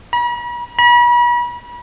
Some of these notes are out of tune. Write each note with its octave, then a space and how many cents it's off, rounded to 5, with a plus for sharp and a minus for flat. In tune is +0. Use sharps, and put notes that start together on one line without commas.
B5 -45
B5 -40